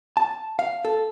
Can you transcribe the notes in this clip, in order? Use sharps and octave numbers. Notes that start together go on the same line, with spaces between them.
A5
F5
A4